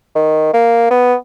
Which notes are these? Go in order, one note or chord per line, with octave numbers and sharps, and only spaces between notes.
D#3
A#3
B3